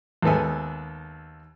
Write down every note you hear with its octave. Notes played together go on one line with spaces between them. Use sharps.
D#2 G#3 B3 A4 E5 G#5